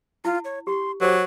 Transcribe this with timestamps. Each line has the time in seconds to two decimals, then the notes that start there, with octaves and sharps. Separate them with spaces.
0.25 E4 F4
0.45 C#5
0.67 G4 C6
1.01 F#3 G4 A#4 C5